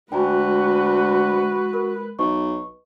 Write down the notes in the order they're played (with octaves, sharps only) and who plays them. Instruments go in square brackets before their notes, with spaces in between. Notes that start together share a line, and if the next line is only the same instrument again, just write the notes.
[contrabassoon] D2 [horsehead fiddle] G#3 B4 [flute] F#4 [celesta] G5 G#5 A#5
[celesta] A#4
[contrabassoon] B1 [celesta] B4 D#5 C#6